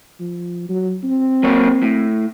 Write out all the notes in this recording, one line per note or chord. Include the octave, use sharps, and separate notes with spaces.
F3
F#3
C4
F#3 A#3 C#5
A2